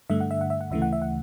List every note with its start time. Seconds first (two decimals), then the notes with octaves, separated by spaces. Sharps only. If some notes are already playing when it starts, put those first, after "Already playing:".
0.10 G2 D3 A3 E5
0.20 F#5
0.31 E5
0.41 F#5
0.50 E5
0.61 F#5
0.70 D2 C#3 E3 A3 E5
0.82 F#5
0.93 E5
1.02 F#5